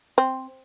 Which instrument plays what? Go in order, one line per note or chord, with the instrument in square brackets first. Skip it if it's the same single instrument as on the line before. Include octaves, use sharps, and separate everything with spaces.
[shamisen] C4